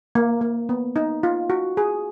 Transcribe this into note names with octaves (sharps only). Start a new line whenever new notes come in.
A#3
A#3
B3
D#4
F4
F#4
G#4